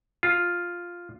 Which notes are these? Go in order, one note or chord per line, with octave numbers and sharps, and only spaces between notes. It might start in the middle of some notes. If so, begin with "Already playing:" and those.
F4